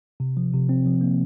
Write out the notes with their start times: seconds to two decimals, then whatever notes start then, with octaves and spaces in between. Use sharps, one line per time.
0.20 C3
0.37 F3
0.53 C3
0.69 C4
0.86 F3
1.01 A#3